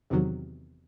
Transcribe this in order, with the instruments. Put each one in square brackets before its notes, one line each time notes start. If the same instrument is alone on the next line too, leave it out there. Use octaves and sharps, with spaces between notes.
[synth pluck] E2 C3 D#3 F#3